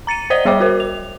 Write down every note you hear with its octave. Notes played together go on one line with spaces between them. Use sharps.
A#5 A6 C#7 D#7
C5 D5 D#5 D#6 D#7 G7
G3 G#4 C#5 E5 G5 D6
F#4 A#4 C5
F7